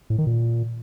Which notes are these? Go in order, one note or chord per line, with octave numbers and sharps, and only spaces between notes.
A2
D#3
A#2